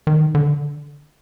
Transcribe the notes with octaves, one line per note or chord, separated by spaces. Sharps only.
D#3
D3